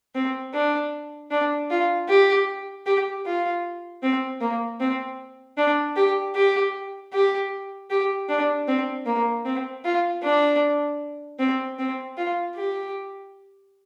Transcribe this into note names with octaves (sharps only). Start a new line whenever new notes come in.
C4
D4
D4
F4
G4
G4
F4
C4
A#3
C4
D4
G4
G4
G4
G4
D4
C4
A#3
C4
F4
D4
C4
C4
F4
G4